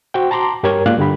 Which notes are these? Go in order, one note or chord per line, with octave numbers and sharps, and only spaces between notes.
F#4 C5 G5
A5 A#5 C6 D6
G2 G4 A#4 C#5 G#6
G#2 A#3 F4 D5 F#6
G2 D3 G4 B5